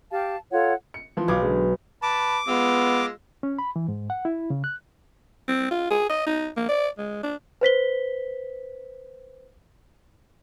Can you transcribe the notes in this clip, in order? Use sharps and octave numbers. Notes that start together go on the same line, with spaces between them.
G4 F5 A5
F4 A4 C#5 F#5
C#7
E3 F3
B1 F5 D6 G#6
D3 G#3
B4 A5 D6
G#3 B3 F4 E6
C#4
B5
E3
G#2
F#5
E4
C#3
F#6
C4
F4
G#4
D#5
D#4
A#3
D5
G#3
D4
B4 C5 B6 G7